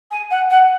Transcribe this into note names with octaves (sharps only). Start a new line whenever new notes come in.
G#5
F#5
F#5